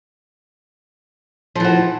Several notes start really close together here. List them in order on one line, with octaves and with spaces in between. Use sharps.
F3 E3 F#4